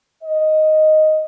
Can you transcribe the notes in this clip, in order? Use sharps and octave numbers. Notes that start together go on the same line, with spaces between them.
D#5